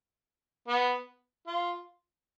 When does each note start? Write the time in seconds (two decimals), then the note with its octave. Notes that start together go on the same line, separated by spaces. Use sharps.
0.68 B3
1.47 F4